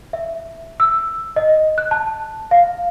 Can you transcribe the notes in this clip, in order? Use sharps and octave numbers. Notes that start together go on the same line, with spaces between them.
E5
E6
D#5
F#6
A5
F5